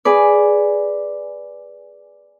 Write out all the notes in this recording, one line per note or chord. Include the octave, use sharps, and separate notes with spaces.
G#4 B4 D5